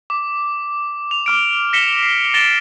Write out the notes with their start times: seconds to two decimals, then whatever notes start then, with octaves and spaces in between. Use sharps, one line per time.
0.10 D6
1.11 F7
1.26 D6 F6 D7
1.73 A#6 B6 C#7 E7 G7
2.02 C7
2.34 A6 A#6 C#7 D7 E7 G7